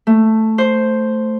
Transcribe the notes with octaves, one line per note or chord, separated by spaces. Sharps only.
A3
C5